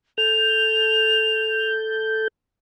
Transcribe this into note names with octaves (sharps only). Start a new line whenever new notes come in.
A4 G6 F7